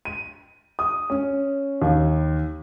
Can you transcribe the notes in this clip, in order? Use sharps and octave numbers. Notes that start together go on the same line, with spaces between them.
D#7
D#6
C#4
D#2